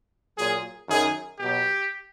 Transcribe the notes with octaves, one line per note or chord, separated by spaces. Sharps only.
A#2 F#3 G#4
F#2 D#3 F#3 G#4
B2 F#3 G4